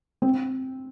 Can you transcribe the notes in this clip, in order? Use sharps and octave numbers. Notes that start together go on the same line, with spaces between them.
C4